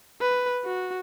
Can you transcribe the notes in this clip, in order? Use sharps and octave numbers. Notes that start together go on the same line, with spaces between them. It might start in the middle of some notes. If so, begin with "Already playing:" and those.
B4
F#4